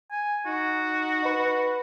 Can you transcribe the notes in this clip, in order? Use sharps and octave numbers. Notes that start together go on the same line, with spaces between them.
G#5
D#4 F#4
B4